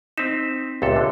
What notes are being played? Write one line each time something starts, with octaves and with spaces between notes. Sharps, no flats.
C4 D#4 B6 E7
C#2 A#2 G4 A4 E5
D3